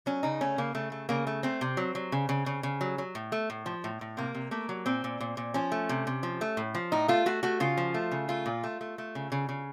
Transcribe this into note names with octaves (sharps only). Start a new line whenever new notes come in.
F#3 C#4
C#3 D#4
A3 C#4
C#3 A#3
C#3 A3
A3
C#3 A#3
A3
A3 C4
C3
F#3
F#3
C#3
C#3
C#3
C#3
F#3
F#3
A2
A3
A2
F3
A2
A2
C3 A#3
C3
A3 A#3
F#3
A#2 C4
A#2
A#2
A#2
F3 C#4
A3
C3
C3
F3
A3
A2
F3
A2 D#4
A3 F4
A3 F#4
A3 F#4
C#3 F4
F3
A3
C#3
A3 F4
A#2
A3
A3
A3
C#3
C#3
C#3